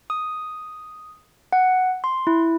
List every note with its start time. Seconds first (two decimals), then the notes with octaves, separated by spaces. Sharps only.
0.10 D#6
1.53 F#5
2.04 C6
2.27 E4